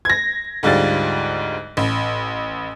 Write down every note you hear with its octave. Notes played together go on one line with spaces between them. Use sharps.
G#6 A#6
D2 G#2 G3 F4 A6
A1